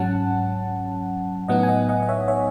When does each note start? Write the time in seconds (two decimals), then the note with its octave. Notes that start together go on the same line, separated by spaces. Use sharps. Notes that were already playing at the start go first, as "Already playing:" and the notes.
Already playing: G#2 F#3 C#4 F#5 A5
1.48 A2 F#3 B3 D#4 D#5 F#5
1.63 G#5
1.68 D#5 F#5
1.89 D#5 F#5
2.03 D#5
2.09 C#5 E5
2.28 C#5 E5